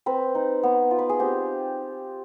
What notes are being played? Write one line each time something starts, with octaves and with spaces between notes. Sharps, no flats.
C4 B4
D#4
B3
F4
B4
G#4
C4 G4